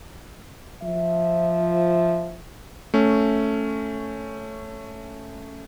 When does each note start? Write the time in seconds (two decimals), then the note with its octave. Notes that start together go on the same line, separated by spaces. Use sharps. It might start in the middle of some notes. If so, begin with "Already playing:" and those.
0.83 F3 E5
2.94 A3 C#4